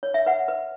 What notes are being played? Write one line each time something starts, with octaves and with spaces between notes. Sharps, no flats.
C#5
E5
B4 F#5
B4